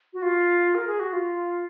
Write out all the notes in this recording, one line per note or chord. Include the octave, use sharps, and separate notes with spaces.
F#4
F4
A#4
G#4
F#4
F4